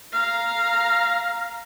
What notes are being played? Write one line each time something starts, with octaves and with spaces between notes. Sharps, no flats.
F5 A#5